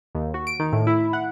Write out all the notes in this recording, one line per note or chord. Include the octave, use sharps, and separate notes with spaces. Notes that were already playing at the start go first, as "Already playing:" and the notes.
D#2
F#4
D7
D#3
A2
E4
F#5